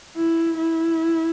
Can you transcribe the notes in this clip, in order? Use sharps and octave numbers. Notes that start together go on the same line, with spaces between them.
E4
E4